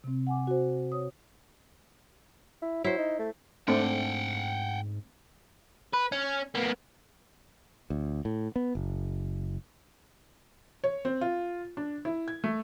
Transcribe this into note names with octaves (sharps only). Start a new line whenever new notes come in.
C3 C4
F#5 G#5 D6
F#4 C5
C#5 D#6
E4
F#3 E4 C5
D#4
A3
G#2 A3 C4 D4 F#5 G5
B4
C#4
A#3 B3
D2
A2
B3
F#1
C#5
C4
F4
D4
E4
G#6
A3